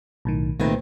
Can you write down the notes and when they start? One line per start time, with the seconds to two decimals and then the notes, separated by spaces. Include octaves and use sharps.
0.25 B1 A2 D#3
0.60 C2 A#2 D#3 A3 C4 B4